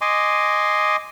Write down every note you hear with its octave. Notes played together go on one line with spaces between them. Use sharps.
D#5 G#5 C6 D6